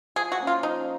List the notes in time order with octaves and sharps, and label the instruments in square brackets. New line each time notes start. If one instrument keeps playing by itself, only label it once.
[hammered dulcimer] F3 [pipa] G#4
[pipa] F#4
[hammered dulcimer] A#3 C#4
[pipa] F4
[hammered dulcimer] F3 [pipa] D#4